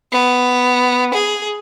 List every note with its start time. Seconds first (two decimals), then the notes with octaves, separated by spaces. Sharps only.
0.12 B3
1.14 G#4